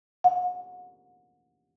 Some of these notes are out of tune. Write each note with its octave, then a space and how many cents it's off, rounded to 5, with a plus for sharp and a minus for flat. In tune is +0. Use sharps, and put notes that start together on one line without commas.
F#5 -35